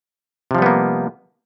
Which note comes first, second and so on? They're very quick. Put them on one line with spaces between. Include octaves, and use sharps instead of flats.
C3 F3 G3 B3 A#3